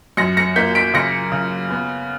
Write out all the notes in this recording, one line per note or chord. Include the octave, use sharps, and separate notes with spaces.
F#2 A#6 C#7
A#6 C#7
A#3 G6 B6
B6 D7
C#3 A#6 C#7
C#3
B3